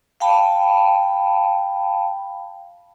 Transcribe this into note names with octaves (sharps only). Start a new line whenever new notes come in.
F5 G5 A5 B5